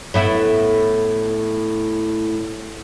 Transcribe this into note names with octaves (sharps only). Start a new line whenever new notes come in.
A2 B3 E4